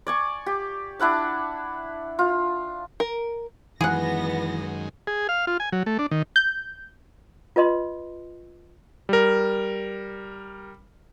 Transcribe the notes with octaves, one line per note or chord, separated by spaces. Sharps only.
D5 G#5 C#6
G4
D4 E4 F#5 A5
F4
A#4
F#2 D#3 E3 G#3 B3 G#4 F#5 A#6
G#4
F5
F4
G#5
F#3
A3
D4
D#3
G6
F4 B4 D#5 C6
G3 A#4